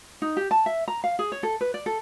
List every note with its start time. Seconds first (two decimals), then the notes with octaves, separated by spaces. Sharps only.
0.22 D#4
0.37 G4
0.51 A5
0.66 E5
0.88 A#5
1.04 F5
1.19 G#4
1.32 C#5
1.43 A4
1.61 B4
1.74 D5
1.86 A4